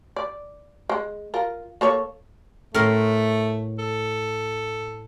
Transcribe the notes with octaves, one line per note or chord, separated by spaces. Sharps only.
D5
G#3
F4 A#4
A#3 A4 C#5
A2 A3 A#4 C6
A4